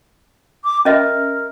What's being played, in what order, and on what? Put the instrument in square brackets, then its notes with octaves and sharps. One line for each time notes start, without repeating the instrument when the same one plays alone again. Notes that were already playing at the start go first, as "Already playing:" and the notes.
[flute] D6
[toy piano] C#4 D#5 E5 [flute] A#4